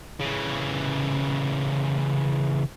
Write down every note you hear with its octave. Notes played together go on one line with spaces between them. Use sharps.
C#3 E3